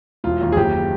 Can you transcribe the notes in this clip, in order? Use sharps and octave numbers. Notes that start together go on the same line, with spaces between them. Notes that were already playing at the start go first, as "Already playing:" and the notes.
E1 F4
D#2
G#4
F#1 G4